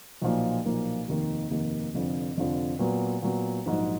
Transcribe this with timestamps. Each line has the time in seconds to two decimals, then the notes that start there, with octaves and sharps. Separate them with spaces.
0.21 B1 A#2 F3 A#3
0.65 B1 A#2 F3 A#3
1.08 F1 D#2 D#3 A#3 D#4
1.50 F1 D#2 D#3 A#3 D#4
1.94 F1 F2 D3 F3
2.36 F1 F2 D3 F3
2.79 A#2 F#3 B3
3.22 A#2 F#3 B3
3.66 A#1 G#2 F#3